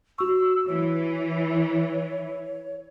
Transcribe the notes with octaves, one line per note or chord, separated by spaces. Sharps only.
F#4 C#6 E6
E3 C#5